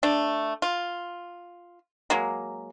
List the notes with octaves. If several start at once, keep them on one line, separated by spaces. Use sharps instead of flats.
A3 D4
F4
F#3 G#3 A#3